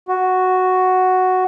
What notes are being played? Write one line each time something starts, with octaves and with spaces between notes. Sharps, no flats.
F#4